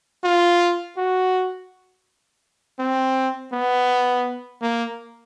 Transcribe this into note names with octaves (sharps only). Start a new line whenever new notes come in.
F4
F#4
C4
B3
A#3